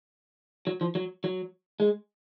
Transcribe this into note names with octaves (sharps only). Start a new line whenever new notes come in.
F#3
F3
F#3
F#3
G#3